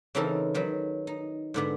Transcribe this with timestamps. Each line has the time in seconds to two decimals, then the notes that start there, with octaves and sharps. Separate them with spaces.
0.15 C#3 E3 C4 D#4 A4 A#4
0.54 D#3 F#3 B4
1.07 D#4
1.54 G#2 D3 B3